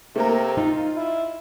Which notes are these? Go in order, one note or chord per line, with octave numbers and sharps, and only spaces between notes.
C3 A3 A#3 A#4
D#4 F4
E4